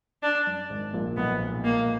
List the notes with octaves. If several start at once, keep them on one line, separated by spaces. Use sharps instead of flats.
D4
F#2
G#1 G#2
A#1 A#2
B1 B2 B3
A#3